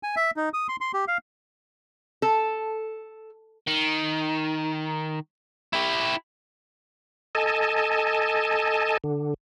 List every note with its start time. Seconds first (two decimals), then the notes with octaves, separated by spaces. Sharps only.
0.03 G#5
0.16 E5
0.37 D#4
0.54 D#6
0.68 C6
0.81 C6
0.94 G4
1.08 F5
2.22 A4
3.67 D#3
5.73 E4 G4
7.35 A4 D#5 G#5 A5
9.04 D3